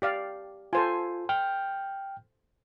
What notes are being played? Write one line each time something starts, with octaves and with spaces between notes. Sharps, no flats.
G4 D5 F5
F4 A4 C5 G#5
G5 F6 G6